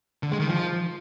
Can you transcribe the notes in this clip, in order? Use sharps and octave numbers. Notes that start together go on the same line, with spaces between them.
D3
G#3
D#3
F3